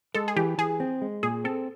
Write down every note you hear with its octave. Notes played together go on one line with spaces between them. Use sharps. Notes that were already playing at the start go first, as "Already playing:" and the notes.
G#3 A4
G#4
E3 G4
E3 G#4
C4
G#3
A#2 G#4
C4 A4